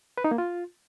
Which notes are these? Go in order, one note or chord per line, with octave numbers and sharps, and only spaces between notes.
B4
D#4
A#3
F4